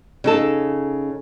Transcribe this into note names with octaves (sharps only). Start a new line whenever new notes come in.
C#3 D#4 A4